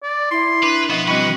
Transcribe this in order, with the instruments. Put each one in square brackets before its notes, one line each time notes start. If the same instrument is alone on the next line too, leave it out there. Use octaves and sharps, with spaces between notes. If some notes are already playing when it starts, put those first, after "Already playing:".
[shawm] D5
[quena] E4 [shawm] C6
[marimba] D4 [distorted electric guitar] B4
[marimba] B2 F3 C#4 [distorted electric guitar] B3 B4 [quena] D#5
[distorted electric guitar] E3 B4 [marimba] G3 C4 F#4 [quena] D#5 [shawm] C#6